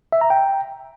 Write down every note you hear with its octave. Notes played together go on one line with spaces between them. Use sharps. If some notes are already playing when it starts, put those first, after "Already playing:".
E5
A#5
G5